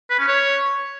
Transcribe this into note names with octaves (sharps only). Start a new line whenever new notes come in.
B4
C#4
C#5